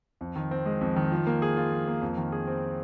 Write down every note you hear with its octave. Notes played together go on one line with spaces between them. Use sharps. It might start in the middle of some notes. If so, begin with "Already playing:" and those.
F2
D#3
C4
G#3
F2
D#3
F3
A#3
G#4
F4
F3
A#3
F2
D#3
G#4
C4